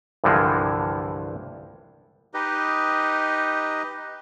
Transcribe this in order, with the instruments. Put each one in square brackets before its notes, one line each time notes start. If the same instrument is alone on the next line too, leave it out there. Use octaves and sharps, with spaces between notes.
[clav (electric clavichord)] C2 G2 D3 E3 F3 G#3
[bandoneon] D#4 G4 B4 D#5